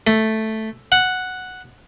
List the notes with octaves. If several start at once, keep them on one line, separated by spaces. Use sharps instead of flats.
A3
F#5